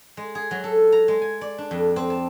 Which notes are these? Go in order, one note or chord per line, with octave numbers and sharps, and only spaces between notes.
G#3
G#4
F#3
A4
A#5
G#3
G#5
D5
D4
F2
C4
A5